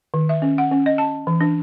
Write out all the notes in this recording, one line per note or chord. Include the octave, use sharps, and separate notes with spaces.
D#3
E5
C#4
F#5
C#4
D#5
A5
E3
D4